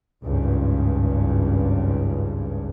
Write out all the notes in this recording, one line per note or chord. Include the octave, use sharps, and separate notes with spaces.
G#1 C#2 G2